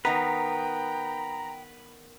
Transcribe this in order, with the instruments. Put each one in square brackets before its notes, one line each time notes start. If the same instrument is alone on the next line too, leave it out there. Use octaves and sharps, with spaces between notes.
[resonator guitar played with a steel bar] D#3 B3 [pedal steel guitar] B4 [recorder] G5 [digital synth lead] A#5